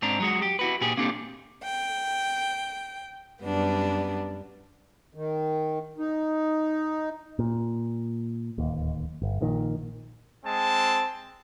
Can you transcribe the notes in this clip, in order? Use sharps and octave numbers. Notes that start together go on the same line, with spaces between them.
G#2 C4 D4 A#5
F#3 G#3 F#4
G4
E4 F#4 B4
A#2 G4 G#4
A#3 C4 D4 G4 A4
G5
F#2 G3 B3 D4
D#3
D#4
A#2
D1 D#2
G1
A#1 A#2 D#3
G#3 C4 A5